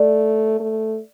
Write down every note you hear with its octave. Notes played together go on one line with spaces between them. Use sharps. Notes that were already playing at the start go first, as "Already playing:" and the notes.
Already playing: A3 D5
A3